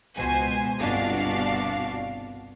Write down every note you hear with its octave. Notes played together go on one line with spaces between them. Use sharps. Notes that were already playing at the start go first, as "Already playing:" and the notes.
C#2 B2 C5 G#5
G1 C2 B2 D4 F#4 F5